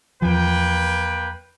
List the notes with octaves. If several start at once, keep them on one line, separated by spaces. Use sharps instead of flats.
E2 F3 A#3 B4 G5